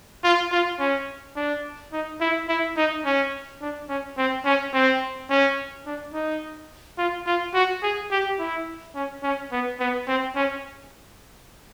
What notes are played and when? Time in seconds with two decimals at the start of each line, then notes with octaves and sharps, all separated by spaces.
0.24 F4
0.52 F4
0.79 C#4
1.36 D4
1.93 D#4
2.20 E4
2.49 E4
2.77 D#4
3.05 C#4
3.61 D4
3.89 C#4
4.18 C4
4.45 C#4
4.74 C4
5.30 C#4
5.86 D4
6.14 D#4
6.98 F4
7.26 F4
7.54 F#4
7.83 G#4
8.11 G4
8.39 E4
8.95 C#4
9.23 C#4
9.52 B3
9.80 B3
10.08 C4
10.36 C#4